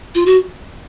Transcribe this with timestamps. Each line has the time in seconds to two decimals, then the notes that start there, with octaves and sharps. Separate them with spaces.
0.15 F4
0.26 F#4